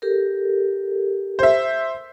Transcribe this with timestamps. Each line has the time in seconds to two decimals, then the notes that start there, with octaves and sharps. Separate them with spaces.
0.02 G4 A4 A#4
1.39 C5 E5